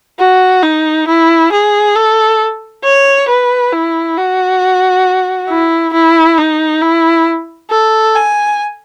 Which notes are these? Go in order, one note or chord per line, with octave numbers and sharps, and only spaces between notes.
F#4
D#4
E4
G#4
A4
C#5
B4
E4
F#4
E4
E4
D#4
E4
A4
G#5